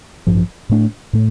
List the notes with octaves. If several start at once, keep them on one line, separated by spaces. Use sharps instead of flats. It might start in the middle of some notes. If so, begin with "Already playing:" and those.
A1 G2 F3
A2 A3 D4
A2 A3